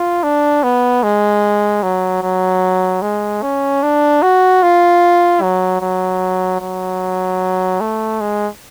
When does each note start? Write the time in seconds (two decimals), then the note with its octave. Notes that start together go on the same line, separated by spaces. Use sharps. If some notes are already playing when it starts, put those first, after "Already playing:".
Already playing: F4
0.23 D4
0.63 B3
1.03 G#3
1.83 F#3
2.22 F#3
3.02 G#3
3.43 C#4
3.83 D4
4.23 F#4
4.63 F4
5.42 F#3
5.81 F#3
6.61 F#3
7.81 A3
8.21 G#3